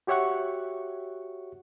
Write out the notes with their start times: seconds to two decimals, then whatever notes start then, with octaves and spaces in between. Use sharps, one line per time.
0.07 F#4 G4 C#5 E5 F#5 C#6